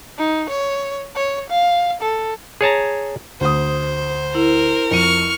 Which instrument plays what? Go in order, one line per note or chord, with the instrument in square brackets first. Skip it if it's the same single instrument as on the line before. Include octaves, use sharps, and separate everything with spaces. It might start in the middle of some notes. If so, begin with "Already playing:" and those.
[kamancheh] D#4
C#5
C#5
F5
A4
[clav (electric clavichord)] G#4 C#5 A5 A#5
[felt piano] D2 D#6 [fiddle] C5
[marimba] E4 [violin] A#4
[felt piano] F2 D#7 [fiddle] C#6 F6